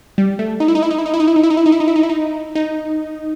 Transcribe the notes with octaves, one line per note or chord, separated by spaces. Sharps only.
G3
A3
D#4
E4
D#4
E4
D#4
E4
D#4
E4
D#4
E4
D#4
E4
D#4
E4
D#4
E4
D#4
E4
D#4
E4
D#4
D#4